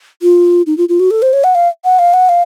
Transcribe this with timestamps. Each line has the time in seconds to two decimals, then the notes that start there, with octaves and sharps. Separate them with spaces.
0.22 F4
0.66 D#4
0.77 F4
0.89 F4
0.99 F#4
1.10 A4
1.22 C5
1.33 C#5
1.44 F#5
1.55 F5
1.84 F#5
1.99 F5
2.13 F#5
2.29 F5